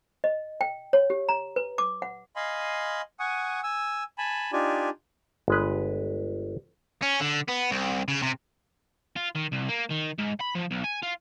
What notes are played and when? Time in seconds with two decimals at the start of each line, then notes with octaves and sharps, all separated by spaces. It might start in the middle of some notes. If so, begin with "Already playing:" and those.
0.24 D#5
0.61 G5
0.93 C#5
1.10 G4
1.29 A#5
1.56 B4
1.78 D6
2.02 F#5
2.36 D#5 F5 G#5 B5 C6
3.20 F#5 G#5 C#6 D#6
3.63 G#5 E6
4.18 G#5 A5 B5
4.53 D4 D#4 F4 G4 D5 G#5
5.48 G1 G#3 B4
7.02 C#4
7.20 D3
7.49 B3
7.71 C2
8.08 C#3
8.22 C3
9.16 F4
9.36 D#3
9.53 C2
9.69 A#3
9.91 D#3
10.19 G#2
10.41 B5
10.55 F3
10.71 B1
10.84 G#5
11.03 F4